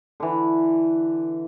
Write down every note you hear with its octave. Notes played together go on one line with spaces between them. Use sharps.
D3 E3